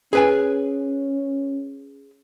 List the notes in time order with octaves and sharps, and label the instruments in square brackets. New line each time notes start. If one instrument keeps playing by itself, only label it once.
[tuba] C#4 [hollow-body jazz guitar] G#4 B4 G#5